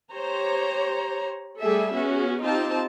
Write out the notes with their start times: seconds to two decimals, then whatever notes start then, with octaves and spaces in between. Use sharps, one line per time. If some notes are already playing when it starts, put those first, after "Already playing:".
0.13 G4 C5 C#5 A#5
1.60 G3 A3 G#4 A4 E5
1.94 B3 C#4 F#4 G#4
2.42 C4 D#4 F4 G4 C5 A5